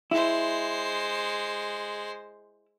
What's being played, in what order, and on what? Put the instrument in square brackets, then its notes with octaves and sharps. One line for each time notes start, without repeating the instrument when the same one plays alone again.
[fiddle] G#3 C5 [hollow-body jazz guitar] E4